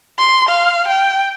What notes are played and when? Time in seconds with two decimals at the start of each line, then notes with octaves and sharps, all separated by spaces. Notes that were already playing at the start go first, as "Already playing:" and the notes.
0.19 C6
0.49 F5
0.87 G5